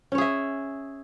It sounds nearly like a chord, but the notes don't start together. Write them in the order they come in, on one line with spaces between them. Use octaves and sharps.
C#4 C#5 G#4 E5